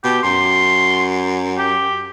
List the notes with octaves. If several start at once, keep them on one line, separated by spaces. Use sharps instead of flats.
B2 G4
F#2 C6
G4